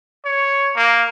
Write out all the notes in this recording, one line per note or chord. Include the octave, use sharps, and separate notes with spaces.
C#5
A#3